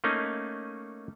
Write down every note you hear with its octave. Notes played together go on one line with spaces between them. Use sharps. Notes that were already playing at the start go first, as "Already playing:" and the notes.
A3 A#3 C#4 D#4